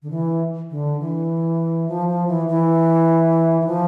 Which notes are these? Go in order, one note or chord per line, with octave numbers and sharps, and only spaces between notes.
D3
E3
D3
E3
F3
F3
E3
E3
E3
F3